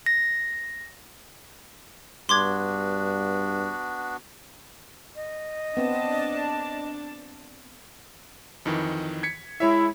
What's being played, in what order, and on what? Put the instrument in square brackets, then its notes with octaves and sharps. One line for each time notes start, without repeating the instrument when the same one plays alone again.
[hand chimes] A#6
[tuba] G2 [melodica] B3 D4 F#4 [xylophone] C6 D6 G#6
[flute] D#5
[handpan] B3 C4 [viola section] D4 A5
[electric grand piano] F2 D#3 E3
G#6 B6 C#7
[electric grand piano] G#3 C#5 E5 [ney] E4